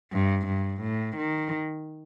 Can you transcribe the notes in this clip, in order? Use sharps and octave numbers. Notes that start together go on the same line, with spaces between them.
G2
G2
A2
D#3